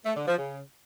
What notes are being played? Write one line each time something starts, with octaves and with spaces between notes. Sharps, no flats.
A3
D3
F3
C#3